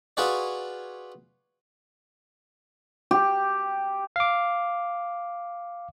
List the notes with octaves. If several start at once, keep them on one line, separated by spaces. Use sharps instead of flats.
F4 F#4 G#4 B4 C#5 D5
G4
F5 D6